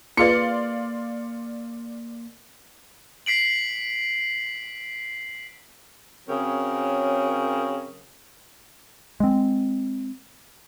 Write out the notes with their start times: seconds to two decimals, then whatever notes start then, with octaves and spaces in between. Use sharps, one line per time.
0.17 A#3 F4 G#4 B4 D5 F5 C6 C#7
3.26 B6 C7 D7 F#7
6.29 C#3 F#3 C4 A#4 C#5
9.20 G#3 C4